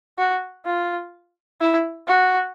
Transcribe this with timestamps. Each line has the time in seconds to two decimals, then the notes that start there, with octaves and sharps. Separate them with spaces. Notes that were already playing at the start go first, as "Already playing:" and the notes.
0.18 F#4
0.65 F4
1.60 E4
2.07 F#4